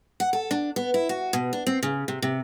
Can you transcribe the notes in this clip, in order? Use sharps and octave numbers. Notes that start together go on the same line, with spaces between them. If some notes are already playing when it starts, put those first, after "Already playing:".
F#5
A4
D4
B3
E4
F#4
B2
D4
C4
C#3
C3
C3